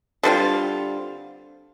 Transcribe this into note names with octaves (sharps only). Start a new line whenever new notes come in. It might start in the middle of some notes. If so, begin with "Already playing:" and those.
D3 G3 C4 F4